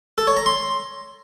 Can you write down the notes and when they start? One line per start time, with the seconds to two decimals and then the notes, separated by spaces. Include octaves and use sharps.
0.18 A4
0.27 C#5
0.37 A#5
0.46 C6